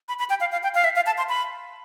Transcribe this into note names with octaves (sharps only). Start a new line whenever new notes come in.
B5
B5
G5
F5
F5
G5
F5
E5
F5
A5
C6
B5